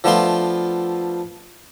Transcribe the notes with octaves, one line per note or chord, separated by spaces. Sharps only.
F3 A3 B3 D4 F4 C6